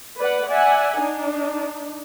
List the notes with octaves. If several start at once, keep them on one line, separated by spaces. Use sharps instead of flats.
B4 D5 F#5
D5 E5 F#5 G#5
D4 D#4